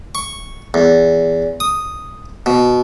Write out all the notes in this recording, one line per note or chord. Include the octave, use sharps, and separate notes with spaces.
C#6
E2
D#6
B2